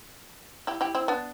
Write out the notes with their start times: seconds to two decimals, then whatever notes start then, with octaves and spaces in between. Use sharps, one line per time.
0.67 E4 G4
0.81 E4 G4
0.95 C4 E4
1.08 B3 D4